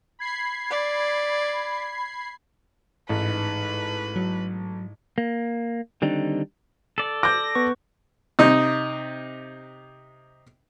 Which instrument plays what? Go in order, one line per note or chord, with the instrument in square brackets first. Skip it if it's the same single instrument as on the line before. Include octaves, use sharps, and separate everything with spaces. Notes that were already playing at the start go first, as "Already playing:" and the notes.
[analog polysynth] B5 G#6 C7
[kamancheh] D5
[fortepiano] A1 [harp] G#2 [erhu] B4
[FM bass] F#3
[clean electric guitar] A#3
D3 D#3 G3 C4 D4 D#4
[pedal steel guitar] A4 D5
[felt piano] D6 G6 [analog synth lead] A#6
[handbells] B3 B4 C#6
[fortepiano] C3 D#4